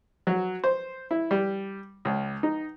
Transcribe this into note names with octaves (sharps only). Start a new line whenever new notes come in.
F#3
C5
E4
G3
C#2
D#4